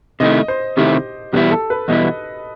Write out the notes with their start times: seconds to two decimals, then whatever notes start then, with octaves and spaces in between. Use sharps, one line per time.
0.20 C3 D#3 A3 E4 D#5
0.48 C5
0.77 C3 D#3 A3 E4 G4
1.33 E2 B2 G3 B3 E4 G4
1.51 A4
1.70 B4
1.88 E2 B2 G3 B3 E4 D#5